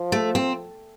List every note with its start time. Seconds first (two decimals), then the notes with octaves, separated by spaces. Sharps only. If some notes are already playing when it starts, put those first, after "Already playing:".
Already playing: F3
0.12 A3
0.35 C4